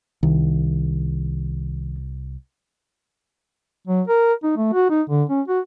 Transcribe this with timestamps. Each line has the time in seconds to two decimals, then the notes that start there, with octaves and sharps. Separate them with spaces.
0.23 C2 D#3
3.87 F#3
4.07 A#4
4.43 D#4
4.57 A3
4.73 F#4
4.90 D#4
5.09 D3
5.30 C#4
5.48 F#4